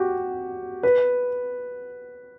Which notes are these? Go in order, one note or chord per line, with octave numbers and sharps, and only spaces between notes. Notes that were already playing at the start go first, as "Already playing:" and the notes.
Already playing: F#4 G4
B4